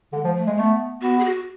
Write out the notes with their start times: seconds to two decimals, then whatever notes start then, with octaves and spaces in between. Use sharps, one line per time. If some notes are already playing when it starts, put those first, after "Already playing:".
0.13 D3 G#3
0.24 F3
0.35 A3
0.47 G#3
0.57 A3 B3
1.02 B3 F#4
1.20 G#4
1.25 F#4